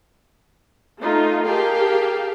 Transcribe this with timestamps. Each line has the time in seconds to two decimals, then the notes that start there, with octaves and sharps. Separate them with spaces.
1.01 A3 D#4 F4
1.46 G4 G#4 A#4 F5 G5 A5